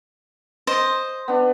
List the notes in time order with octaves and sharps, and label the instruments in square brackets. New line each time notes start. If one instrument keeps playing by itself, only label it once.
[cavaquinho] C5 D#5
[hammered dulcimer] B3 D4